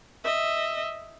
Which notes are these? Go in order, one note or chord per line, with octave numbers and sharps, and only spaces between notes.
D#5 E5